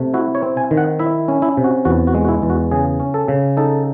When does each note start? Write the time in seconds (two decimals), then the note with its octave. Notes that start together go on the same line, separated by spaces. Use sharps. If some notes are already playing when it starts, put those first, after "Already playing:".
Already playing: C3 A3
0.14 E4 F#4
0.35 C#5
0.42 C4
0.57 G#5
0.71 D#3
0.77 F#5
0.99 E4 E5
1.28 C#4
1.42 E4
1.57 C3
1.64 F#4
1.85 E2 F#4
2.07 F#4
2.14 G#3
2.25 F#4
2.29 E4
2.42 E2
2.50 F#4
2.71 C#3 G#4
3.00 C#4
3.14 A4
3.28 C#3
3.57 D#4 A4